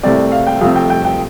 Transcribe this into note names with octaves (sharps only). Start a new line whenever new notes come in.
C2 C3 A3 C4 D5
F5
G5
F2 C3 A3 C4 F5
G5
G5
G5